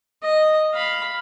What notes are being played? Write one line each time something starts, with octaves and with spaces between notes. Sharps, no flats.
D#5
F5 B5